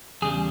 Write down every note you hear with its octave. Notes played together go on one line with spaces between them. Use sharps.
E2 C#3 G3 G#4